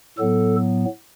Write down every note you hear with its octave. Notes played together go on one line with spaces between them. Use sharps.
A2 F#3 B3 A4